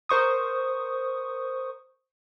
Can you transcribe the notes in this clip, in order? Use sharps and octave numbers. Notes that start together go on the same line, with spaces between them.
A#4 C5 C#6 D#6